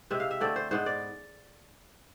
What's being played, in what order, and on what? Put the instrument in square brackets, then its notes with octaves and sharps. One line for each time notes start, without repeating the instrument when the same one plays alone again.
[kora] C3 G#3 C4 E5
F5
E5
D3 A3 C4 D5
C5
G#2 G#3 B3 C5
D5